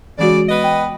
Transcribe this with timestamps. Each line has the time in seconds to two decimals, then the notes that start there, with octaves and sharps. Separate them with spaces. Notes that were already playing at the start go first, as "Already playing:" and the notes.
0.19 C#3 E3 G#3 F#4 D5
0.49 B3 B4 D#5
0.64 G5